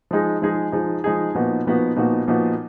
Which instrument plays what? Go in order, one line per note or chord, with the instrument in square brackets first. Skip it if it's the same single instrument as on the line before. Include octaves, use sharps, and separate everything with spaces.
[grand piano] F3 G#3 D#4 G#4
F3 G#3 D#4 G#4
F3 G#3 D#4 G#4
F3 G#3 D#4 G#4
A#2 F3 B3 D#4 F#4
A#2 F3 B3 D#4 F#4
A#2 F3 B3 D#4 F#4
A#2 F3 B3 D#4 F#4